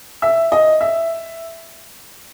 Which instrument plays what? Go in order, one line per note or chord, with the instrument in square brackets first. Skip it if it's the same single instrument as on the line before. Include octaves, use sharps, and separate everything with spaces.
[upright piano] E5
D#5
E5